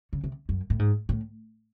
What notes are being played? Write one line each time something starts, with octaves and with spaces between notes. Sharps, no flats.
C#3
C3
F#2
A2
G#2
A2